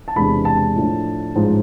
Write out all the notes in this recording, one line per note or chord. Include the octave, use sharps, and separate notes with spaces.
A5
E1 E2 C3 G#3 D4 B5
A5
A2 F3 A3 D4
A1 G#2 F3 G#3